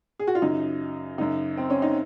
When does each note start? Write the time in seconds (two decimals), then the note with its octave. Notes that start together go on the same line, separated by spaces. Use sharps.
0.19 G#4
0.27 F#4
0.35 F4
0.42 F#2 C#3 D#4
1.18 F#2 C#3 D#4
1.57 C4
1.70 C#4
1.82 D#4